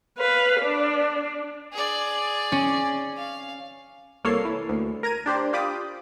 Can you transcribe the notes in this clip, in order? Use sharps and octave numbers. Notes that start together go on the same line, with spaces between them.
B4 F5
D4
G#4 D5
C#4
F5
C2 A#3 A4 C#5 C7
E3
D2
A#4 A#5 G#6 D#7
D4 G4 C5 D5
F4 G4 B5 D6 D#6